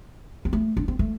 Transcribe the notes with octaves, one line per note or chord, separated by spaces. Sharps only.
C4
A3
D4
C4
A3